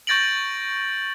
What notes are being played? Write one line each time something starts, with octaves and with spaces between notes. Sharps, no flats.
C#6 G6 A6 A#6 D7 F#7